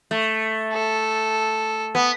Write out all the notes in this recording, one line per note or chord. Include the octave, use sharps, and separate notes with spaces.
A3
A4
B3